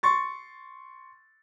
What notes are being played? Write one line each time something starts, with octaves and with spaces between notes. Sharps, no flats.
C6 C#6 A6